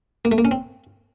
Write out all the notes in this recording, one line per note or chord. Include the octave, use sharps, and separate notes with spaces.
A#3
A3
A#3
C#4
C4